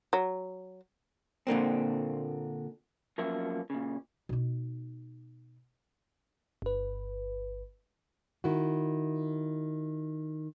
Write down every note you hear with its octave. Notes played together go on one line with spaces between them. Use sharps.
F#3
A#2 D3 A#3 C4
F3 F#3 A#3 B3 C#4 E5
A#2 C#3
B2 D#4
G1 B4
D#3 E4 F#4